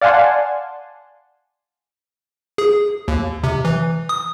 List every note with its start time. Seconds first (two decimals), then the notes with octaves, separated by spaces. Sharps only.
0.01 D5 F5 F#5 G#5 A5 C6
2.58 G#4
3.08 D#2
3.44 C3
3.65 E3
4.09 D#6